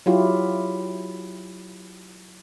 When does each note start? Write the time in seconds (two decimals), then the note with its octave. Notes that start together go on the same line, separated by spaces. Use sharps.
0.06 F#3 E4 F4 G4